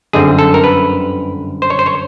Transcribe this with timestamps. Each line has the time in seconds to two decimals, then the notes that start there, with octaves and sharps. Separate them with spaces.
0.13 G1 F#2 D3 G3 C4 G#4
0.39 A4
0.54 A#4
0.64 B4
1.62 C5
1.70 C#5
1.79 C5
1.86 C#5